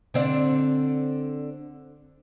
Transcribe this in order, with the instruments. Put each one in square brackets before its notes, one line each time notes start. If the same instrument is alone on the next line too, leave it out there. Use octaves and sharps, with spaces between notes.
[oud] D3 C4 D5